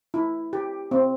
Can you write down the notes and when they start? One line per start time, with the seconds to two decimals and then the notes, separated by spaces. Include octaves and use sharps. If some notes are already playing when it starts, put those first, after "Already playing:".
0.14 E4
0.53 G4
0.91 C4